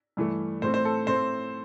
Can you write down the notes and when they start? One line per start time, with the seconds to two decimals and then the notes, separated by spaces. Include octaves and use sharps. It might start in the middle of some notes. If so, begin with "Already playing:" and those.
0.17 G2 E3 A3
0.62 A2 A3 C4 C5
0.74 C5
0.85 A4
1.07 A2 A3 C4 C5